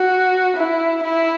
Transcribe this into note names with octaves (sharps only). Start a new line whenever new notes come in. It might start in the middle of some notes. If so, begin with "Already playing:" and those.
Already playing: F#4
E4
E4